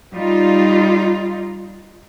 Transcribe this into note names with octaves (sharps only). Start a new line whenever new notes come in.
G3 D#4 F4